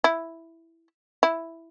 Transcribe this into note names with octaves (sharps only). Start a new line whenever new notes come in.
E4
E4